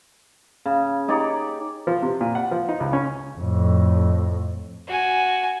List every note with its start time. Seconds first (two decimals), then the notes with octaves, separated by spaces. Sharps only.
0.66 C#3
1.08 D#4 G4 C#5 D5
1.87 F3
2.02 C3
2.21 A#2
2.35 F#5
2.51 F3
2.69 D#4
2.80 C#2
2.93 C#4
3.38 F2 A2
4.88 F#4 G#5